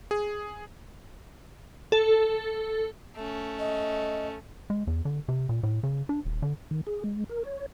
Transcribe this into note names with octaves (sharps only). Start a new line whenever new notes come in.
G#4
A4
A3 C#4
D#5
G#3
E2
D3
C3
A#2
A2
C#3
D4
D#1
D3
D#3
G#4
G#3
A#4
C#5